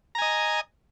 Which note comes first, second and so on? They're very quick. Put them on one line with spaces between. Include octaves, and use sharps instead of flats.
A#5 G#5 D#5